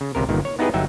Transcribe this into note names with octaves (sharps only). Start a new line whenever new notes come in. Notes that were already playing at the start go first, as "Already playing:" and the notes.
C#3
G#1 C#2 C3 A#4
G1 A#2 D#3
C#5
B3 D#4 E4 G4 G#4 B4
G1 F#3 D#4 E5 G5